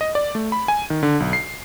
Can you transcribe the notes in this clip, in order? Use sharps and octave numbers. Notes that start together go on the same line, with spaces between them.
D#5
D5
A3
B5
G#5
D#3
D3
B1
C7